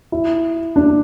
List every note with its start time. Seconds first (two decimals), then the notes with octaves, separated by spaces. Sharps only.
0.12 E4
0.76 D4